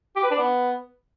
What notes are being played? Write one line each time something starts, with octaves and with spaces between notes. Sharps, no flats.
G4
B4
D4
B3